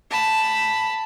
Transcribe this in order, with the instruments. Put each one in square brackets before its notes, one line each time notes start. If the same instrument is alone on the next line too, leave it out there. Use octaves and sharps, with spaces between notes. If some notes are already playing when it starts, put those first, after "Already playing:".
[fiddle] A5 B5